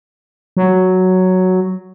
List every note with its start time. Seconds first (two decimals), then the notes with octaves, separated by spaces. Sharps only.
0.57 F#3